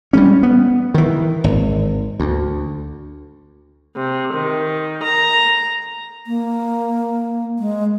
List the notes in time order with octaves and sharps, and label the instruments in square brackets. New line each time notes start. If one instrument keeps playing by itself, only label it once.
[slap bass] G3 G#3 C#4
B3
D#3 E3
G#1
D2
[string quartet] C3
D#3
A#5
[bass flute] A#3
G#3